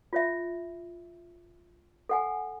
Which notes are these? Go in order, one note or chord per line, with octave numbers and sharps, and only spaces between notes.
F4 C#5 E5
A4 F#5 G#5